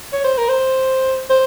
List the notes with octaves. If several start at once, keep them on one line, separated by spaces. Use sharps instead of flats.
C#5
C5
A#4
C5
C5